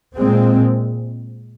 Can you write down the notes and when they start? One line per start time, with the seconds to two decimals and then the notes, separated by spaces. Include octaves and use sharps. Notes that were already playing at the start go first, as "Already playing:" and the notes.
0.16 A#2 G#3 C4